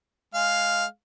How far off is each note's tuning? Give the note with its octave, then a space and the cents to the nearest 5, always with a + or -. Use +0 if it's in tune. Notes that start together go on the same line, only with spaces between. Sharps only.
G#3 +0 F5 +0